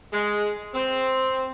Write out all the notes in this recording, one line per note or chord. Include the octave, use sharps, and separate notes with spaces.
G#3
C4